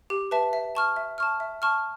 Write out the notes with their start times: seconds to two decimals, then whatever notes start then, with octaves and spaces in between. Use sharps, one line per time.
0.10 G4
0.31 B4 E5 A5
0.53 E5
0.75 A5 C#6 F6
0.96 E5
1.18 A5 C#6 F6
1.40 E5
1.62 A5 C#6 F6